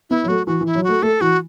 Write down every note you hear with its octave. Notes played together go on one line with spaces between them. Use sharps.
B3 E4
F#3
A3 F#4
E3 F#4
E3
E4
F#3
A3 F#4
A3 A4
E3 F#4